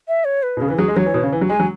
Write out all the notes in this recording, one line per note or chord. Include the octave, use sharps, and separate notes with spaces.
E5
C#5
B4
B2
C#3 G#4
E3 B4
F#3 G#4
G#3
F#3 C#5
E3
B2
C#3
E3
F#3
G#3 G#5
F#3